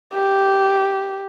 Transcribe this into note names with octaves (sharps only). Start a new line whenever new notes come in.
G4